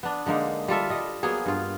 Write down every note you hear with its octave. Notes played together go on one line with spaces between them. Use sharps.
B3 D4
D3 G#3 A#3 D#4
G3 F4 A4 E5
G3 D#5
F#3 A#3 B3 G#4
G2 F4